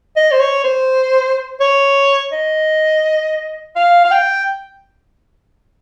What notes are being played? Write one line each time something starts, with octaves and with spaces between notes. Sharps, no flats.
D#5
C5
C#5
C5
C#5
D#5
F5
F5
G5